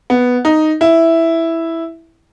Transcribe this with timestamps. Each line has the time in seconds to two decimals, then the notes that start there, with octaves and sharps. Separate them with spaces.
0.10 B3
0.45 D#4
0.81 E4